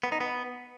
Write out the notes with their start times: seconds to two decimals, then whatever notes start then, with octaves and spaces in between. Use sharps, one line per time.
0.03 B3
0.12 D#4
0.21 B3